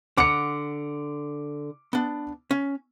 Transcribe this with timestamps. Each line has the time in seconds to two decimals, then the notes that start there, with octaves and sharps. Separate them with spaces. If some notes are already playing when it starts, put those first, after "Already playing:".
0.17 D3 F#5 A#5 D6 C#7
1.93 B3 D4
2.51 C#4